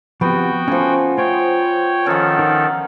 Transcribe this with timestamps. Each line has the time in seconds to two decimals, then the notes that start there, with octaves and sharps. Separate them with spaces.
0.21 F3 B3 C4 F#4 G4 G5
0.68 F3 A3 C#4 G#5
1.18 F4 C5 C#5 G5
2.06 D#3 F3 C#4 A4 F#5
2.39 D#4 A#4